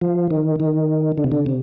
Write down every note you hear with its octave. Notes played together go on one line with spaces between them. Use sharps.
F3
D#3
D#3
D3
C3
D3
C3